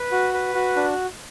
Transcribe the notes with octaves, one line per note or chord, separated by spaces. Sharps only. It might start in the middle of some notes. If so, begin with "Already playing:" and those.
Already playing: B4
F#4
B4
F#4
D4